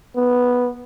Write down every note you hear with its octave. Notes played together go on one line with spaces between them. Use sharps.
B3